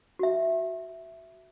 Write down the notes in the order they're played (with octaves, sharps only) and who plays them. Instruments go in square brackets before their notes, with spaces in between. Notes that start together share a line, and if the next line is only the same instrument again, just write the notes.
[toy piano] F#4 E5